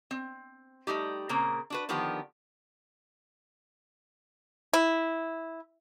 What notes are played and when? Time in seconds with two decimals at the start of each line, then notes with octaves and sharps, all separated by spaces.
0.11 C4
0.87 G3 A3 D#4 G4
1.29 A#2 C#3 A#3 C4 A#5
1.70 D4 F#4 B4
1.89 D3 D#3 F3 B3 G4
4.73 E4